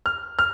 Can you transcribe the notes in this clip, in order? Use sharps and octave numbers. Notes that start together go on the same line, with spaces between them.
F6
F6